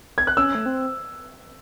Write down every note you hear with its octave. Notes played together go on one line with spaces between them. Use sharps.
G#6
F#6
C#4 E6
A3
C4